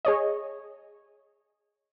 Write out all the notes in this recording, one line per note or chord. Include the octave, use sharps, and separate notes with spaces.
G#4 C#5 D#5